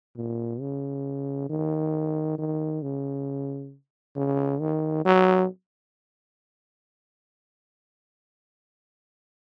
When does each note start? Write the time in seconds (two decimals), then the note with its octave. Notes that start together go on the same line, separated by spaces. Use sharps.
0.16 A#2
0.61 C#3
1.49 D#3
2.38 D#3
2.82 C#3
4.16 C#3
4.60 D#3
5.05 F#3